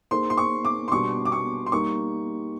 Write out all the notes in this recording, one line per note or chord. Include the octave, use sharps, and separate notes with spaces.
A#3 D#4 G#4 C5 C6
C6
C#6
D6
C6
B2 G3 B3 D4 G4 C#6
D6
C#6
C6
G3 A#3 D#4 C#6